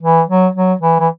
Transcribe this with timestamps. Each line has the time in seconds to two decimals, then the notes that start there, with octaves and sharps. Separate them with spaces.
0.03 E3
0.29 F#3
0.55 F#3
0.82 E3
1.00 E3